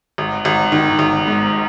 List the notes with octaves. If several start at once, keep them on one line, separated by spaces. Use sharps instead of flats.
G#1
G#1
D#3
G#1
G#2